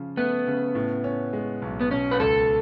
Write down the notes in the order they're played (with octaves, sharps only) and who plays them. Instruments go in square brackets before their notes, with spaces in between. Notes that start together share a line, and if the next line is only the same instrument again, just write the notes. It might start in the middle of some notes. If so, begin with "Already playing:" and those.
Already playing: [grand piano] C#3 F3
[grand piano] A3 [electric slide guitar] B3
[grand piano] C#3
A2
C#4
G#3
B1
[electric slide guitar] B3
[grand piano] B2 [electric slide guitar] C#4
[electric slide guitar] B4
[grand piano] C#2 [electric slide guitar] A4